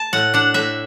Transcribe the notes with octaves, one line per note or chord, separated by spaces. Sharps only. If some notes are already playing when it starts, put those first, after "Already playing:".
Already playing: A5
A2 F#5
D4 F#5
A2 E5